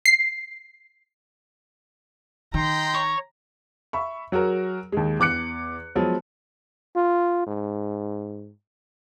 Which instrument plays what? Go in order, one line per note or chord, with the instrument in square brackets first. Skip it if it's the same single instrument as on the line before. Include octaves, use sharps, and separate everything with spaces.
[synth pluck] C7
[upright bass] D#3 [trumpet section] D#4 G5 C6 [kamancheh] A#5
[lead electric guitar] C#5
[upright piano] E5 B5 C#6
F#3 F#4 G#4 A#4
D#2 G#3
E2 D6 F#6 C#7
F3 F#3 G#3 B3
[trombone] F4
G#2